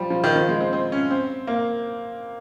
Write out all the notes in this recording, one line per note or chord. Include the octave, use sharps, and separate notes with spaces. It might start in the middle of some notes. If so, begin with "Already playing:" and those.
Already playing: F3 G3
F3
D#3
F3
G#3
C4
C4
C#4
C4
A#3